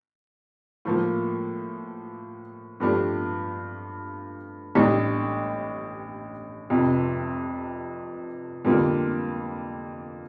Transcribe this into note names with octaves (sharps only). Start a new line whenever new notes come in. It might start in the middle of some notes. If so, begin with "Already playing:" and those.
A2 F3 A#3
G2 F3 A3 D4 G4
A1 A2 G3 D4
F1 F2 C3
F2 D3 G3 A#3 F4